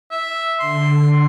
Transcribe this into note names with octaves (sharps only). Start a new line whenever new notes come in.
E5
D3 C6